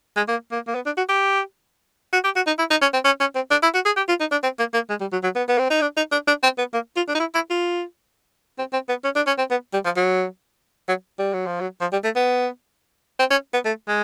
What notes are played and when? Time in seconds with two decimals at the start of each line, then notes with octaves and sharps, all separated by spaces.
0.17 G#3
0.28 A#3
0.52 A#3
0.67 A#3
0.75 B3
0.86 D4
0.97 F#4
1.09 G4
2.13 F#4
2.24 G4
2.36 F#4
2.47 D#4
2.59 E4
2.71 D#4
2.82 C#4
2.94 C4
3.05 C#4
3.20 C#4
3.35 C4
3.51 D4
3.63 E4
3.74 F#4
3.86 G#4
3.97 G4
4.09 F4
4.20 D#4
4.31 D4
4.44 C4
4.59 A#3
4.74 A#3
4.90 G#3
5.01 G3
5.12 F#3
5.24 F#3
5.36 B3
5.49 B3
5.58 C4
5.70 D#4
5.81 D4
5.97 D#4
6.12 D4
6.28 D4
6.43 C4
6.58 B3
6.74 A#3
6.96 F4
7.08 D4
7.15 D#4
7.20 E4
7.35 E4
7.50 F4
8.58 C4
8.73 C4
8.89 B3
9.04 C#4
9.16 D4
9.27 C#4
9.38 C4
9.51 B3
9.74 G3
9.85 F3
9.96 F#3
10.88 F#3
11.19 G3
11.33 F#3
11.46 F3
11.60 F#3
11.81 F3
11.92 G3
12.04 A3
12.16 B3
13.19 C4
13.31 C#4
13.53 B3
13.65 A3
13.88 G#3